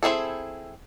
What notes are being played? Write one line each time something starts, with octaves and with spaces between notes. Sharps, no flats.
C4 E4 G#4 A4